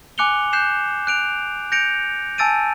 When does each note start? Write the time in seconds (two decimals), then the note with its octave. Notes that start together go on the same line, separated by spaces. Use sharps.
0.18 G#5 D6 F#6 C#7 F7 G7
0.53 F#6 G6 C7 E7
1.07 F#6 D7 F7
1.72 G6 A#6 C#7 D7 F7
2.38 G#5 A5 E6 A6 D7 D#7